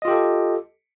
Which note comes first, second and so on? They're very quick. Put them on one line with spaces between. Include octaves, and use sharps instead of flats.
D#5 F4 G4 A4